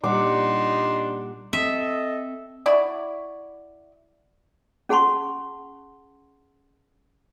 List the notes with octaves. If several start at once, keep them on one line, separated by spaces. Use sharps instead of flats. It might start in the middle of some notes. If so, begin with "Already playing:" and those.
A#2 G3 D4 D#4 F#5 C6 D6
C4 A4 D#5 E5
E4 F#4 D5
C#4 G#4 F#5 A5 C6 C#6